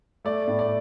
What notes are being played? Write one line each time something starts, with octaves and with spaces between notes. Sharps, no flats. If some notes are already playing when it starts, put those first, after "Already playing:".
A3 D5
A2
D5